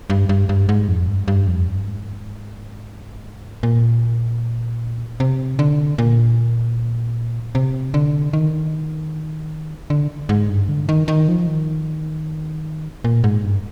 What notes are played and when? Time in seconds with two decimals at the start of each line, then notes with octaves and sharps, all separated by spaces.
0.10 G2
0.29 G2
0.49 G2
0.69 G#2
0.88 F2
1.08 G2
1.28 G2
1.47 F2
1.67 G2
1.86 G#2
3.63 A#2
5.20 C3
5.59 D3
5.98 A#2
7.55 C3
7.94 D3
8.33 D#3
9.90 D3
10.29 G#2
10.49 G2
10.69 D3
10.89 D#3
11.08 D#3
11.28 F3
11.47 D#3
13.04 A#2
13.24 G#2
13.43 G2